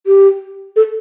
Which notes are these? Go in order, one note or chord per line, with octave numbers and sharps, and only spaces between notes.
G4
A4